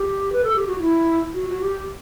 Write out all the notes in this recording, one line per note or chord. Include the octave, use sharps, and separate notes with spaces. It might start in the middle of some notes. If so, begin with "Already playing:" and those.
Already playing: G4
B4
A4
G4
F#4
E4
F#4
F#4
G4